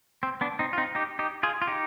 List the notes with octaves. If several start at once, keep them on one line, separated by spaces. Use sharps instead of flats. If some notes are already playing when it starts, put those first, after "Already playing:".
C4
B3 D4
C4 D#4
F4
C4 D#4
D#4 G4
D#4 G4
F4 G#4
F4
D#4 G4